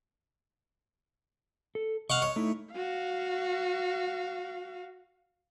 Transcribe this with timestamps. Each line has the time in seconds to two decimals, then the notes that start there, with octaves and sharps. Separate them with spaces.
1.75 A4
2.10 D#5 F5 F#5 C#6
2.22 C#5
2.36 A3 D#4 E4
2.73 F#4 F5